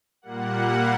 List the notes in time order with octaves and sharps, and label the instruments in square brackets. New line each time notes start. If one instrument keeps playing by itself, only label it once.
[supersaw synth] A#2 G3 A#3 F#5